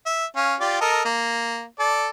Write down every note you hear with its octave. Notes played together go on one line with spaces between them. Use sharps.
E5
C#4 F5
F4 G4 D5
A4 A#4 D#5
A#3
A4 D5